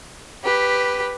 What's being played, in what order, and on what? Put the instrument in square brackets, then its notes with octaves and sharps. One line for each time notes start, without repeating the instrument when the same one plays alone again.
[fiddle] G4 B4